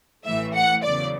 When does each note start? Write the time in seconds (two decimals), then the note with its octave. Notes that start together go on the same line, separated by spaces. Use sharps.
0.24 A1 A2 E3 A3 E5
0.54 F#5
0.83 E2 C#3 F#3 D5